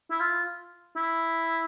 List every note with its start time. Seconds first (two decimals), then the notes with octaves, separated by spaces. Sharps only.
0.11 E4
0.20 F4
0.97 E4